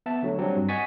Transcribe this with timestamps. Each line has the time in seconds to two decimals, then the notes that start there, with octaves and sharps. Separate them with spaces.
0.06 B3 E5 A5
0.23 D3 F#3 A3
0.38 F#3 G3 C4 D4
0.57 G2
0.69 D#5 F#5 G#5 C#6 A6 B6